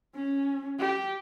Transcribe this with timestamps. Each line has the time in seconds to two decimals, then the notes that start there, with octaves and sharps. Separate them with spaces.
0.15 C#4
0.79 G4